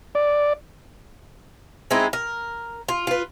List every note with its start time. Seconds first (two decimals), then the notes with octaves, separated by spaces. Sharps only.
0.15 D5
1.91 G#3 C4 D#4 E4
2.13 A#4
2.89 F4
3.07 F4 B4